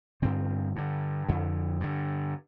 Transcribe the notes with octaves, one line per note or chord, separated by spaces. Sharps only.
G2 D3 C4
G2 D3
F2 D3
G2 D3